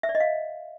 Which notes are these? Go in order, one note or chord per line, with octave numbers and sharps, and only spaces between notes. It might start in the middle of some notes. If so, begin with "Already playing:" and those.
E5
D5
D#5
F5